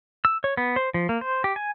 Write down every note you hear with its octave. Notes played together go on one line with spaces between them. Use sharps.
E6
C#5
B3
C5
F3
A#3
C5
G4
G#5